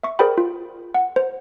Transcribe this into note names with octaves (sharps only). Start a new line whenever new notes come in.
E5 C#6
G#4 A#4 C5 D5 G5 B5
F4
F#5
C5